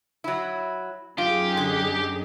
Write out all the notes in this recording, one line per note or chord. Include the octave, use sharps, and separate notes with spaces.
F#3 E4
F#2 D#4 F4 G4 G#4
D3